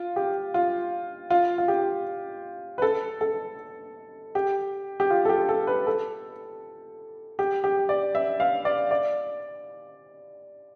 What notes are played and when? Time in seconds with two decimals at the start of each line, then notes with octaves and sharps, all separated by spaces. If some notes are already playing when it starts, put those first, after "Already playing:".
Already playing: F4
0.16 G4
0.54 F4
1.30 F4
1.58 F4
1.68 G4
2.78 B4
2.82 A4
3.21 A4
4.35 G4
5.00 G4
5.10 F4
5.25 A4
5.29 G4
5.49 A4
5.67 B4
5.87 A4
7.39 G4
7.64 G4
7.89 D5
8.15 E5
8.40 F5
8.65 D5
8.91 D5